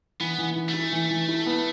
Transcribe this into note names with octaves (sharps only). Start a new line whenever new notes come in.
E3 B3
E3
E3
A3
E4
E3
E3
E4
B3